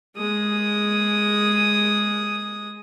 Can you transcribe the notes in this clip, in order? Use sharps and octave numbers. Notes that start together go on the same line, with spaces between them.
G#3 D#6